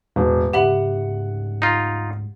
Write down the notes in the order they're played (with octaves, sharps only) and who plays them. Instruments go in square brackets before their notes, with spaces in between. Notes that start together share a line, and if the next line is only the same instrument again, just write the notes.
[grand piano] E1 [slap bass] A2 D4
[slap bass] D2 G#2 C#3 [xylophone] G4 E5 B5 [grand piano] F#5
[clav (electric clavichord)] D#4 F4